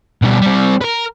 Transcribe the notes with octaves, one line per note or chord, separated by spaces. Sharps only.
B2 G3
G3 C4
A#4 B4